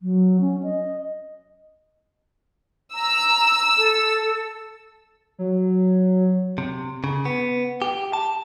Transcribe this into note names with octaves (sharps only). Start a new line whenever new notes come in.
F#3
C#4
D#5
A#5 E6
A4
F#3
C3
C#3
B3
G4
A5